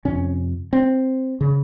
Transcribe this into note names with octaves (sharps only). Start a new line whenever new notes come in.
F2 C3 C#4
C4
C#3